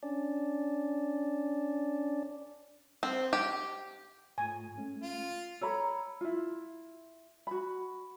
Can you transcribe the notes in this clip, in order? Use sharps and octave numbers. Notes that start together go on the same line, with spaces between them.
C#4 D4 D5
C4
G4
G#2 A3 F4 G#5
G#3 A3 C#4
F4
A4 C#5 A#5 B5
E4 F4
F#4 B5